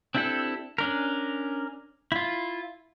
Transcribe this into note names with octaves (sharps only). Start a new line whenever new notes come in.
C4 D4 E4 G4 A4
C#4 D4 A#4
E4 F4